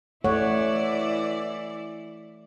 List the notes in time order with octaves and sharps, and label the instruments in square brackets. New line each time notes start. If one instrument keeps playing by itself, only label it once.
[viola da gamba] E3 E4 D5 [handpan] A3 C#5 F#5